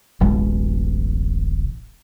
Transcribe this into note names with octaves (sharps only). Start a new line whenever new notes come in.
D1 A1 B2 G#3